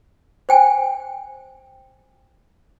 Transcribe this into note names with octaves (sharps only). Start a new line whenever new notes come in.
C5 G5 G#5